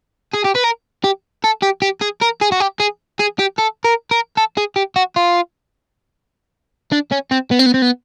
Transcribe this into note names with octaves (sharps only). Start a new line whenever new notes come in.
G#4
G4
B4
A#4
G4
A4
G4
G4
G#4
A#4
G#4
F#4
G4
G#4
G#4
G4
A4
A#4
A#4
A4
G#4
G4
F#4
F4
D4
C#4
C4
B3
C4
B3
C4
B3